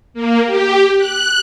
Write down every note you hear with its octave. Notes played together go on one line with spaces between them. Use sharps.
A#3
G4
F#6